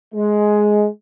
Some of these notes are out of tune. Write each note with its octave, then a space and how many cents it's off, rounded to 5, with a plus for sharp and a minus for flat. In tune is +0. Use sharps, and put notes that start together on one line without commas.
G#3 +10